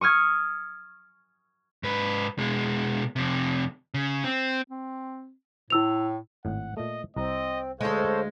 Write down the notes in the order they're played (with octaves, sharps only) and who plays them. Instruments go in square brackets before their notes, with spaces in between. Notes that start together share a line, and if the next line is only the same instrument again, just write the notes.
[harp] C#6 D#6 F6 G#6
[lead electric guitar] G#2 B4
B2 G#3
F2 C3
C#3
C4
[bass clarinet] C4
[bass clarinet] A2 [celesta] E4 E6 F7
[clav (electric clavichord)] G#1 A2 [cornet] F#5
[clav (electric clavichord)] A#2 A3 [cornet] D#5
[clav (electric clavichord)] C2 A#5 [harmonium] C4 [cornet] D#5
[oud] D2 G#3 [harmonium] A4 C5 C#5 [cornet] F5